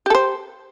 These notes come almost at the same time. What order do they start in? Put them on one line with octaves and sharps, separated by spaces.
G4 A4 C5